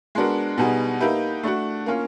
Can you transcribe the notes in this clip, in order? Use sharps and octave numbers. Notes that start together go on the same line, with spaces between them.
G#3 B3 D4 F#4 A#4
B2 G3 B3 D#4 G#4
A#3 D#4 G4 B4 E5
A3 D4 F#4
A#3 C#4 F4